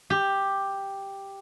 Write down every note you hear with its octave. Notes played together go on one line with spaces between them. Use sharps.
G4